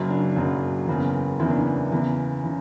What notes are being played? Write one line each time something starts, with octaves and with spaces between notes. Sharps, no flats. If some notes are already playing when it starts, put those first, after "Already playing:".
Already playing: F#1 F#2 C#3 F#3
D4
F#1 F#2 C#3 F#3
F#1 E2 C#3 E3
F#1 E2 C#3 E3 E4
D4
E4
E2 C#3 E3
C#3 E3